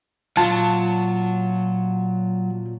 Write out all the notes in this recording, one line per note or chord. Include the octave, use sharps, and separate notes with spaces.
A#2 F#3 F4 A5